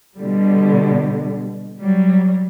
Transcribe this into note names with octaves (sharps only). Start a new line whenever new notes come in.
B2 D3 G3
F#3 G3